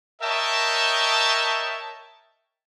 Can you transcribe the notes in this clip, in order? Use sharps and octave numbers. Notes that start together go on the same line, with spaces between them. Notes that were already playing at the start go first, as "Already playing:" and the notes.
A#4 C#5 D#5 E5 G5 A5